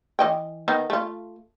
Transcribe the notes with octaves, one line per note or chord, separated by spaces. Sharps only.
E3 D#5 G5
D#3 B3 D#4
A3 F4